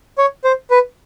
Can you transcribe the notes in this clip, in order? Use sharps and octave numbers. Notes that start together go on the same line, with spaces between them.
C#5
C5
B4